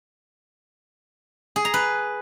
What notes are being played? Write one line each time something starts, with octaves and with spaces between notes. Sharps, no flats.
G#4
A#5
B4